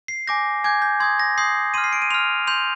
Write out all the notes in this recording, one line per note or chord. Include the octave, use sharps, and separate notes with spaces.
C7
G#5 D6 G6 A#6
G#5 D6 G6 G#6
G6
C6 D#6 G6 G#6
A#6
C6 D#6 G6 C7
C6 F6 D#7
C7
D7
D#7
C6 F6 F7
C6 G6 F7